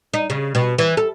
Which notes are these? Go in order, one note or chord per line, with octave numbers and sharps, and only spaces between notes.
D#4
C#3
B2
E3
A4